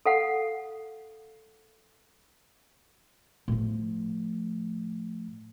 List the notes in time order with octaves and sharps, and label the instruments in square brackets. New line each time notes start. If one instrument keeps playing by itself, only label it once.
[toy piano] A4 F5 F#5
[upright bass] A2 F3